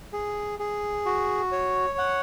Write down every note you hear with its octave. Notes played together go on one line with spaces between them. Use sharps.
G#4
G#4
F#4
C#5
F#5